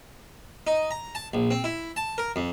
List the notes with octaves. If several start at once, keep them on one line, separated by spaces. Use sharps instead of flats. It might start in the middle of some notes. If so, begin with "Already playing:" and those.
D#4
A#5
A5
A#1
C4
E4
A5
A#4
F2